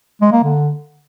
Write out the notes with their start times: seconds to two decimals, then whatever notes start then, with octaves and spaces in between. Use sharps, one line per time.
0.21 G#3
0.32 A#3
0.44 D3